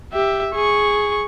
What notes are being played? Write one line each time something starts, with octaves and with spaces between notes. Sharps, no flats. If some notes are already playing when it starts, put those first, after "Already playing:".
G4 E5
G#4 C#6